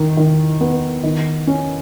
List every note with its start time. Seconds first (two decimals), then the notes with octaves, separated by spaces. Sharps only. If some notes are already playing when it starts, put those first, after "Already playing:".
Already playing: D#3
0.17 D#3
0.61 B3
1.04 D#3
1.47 C#4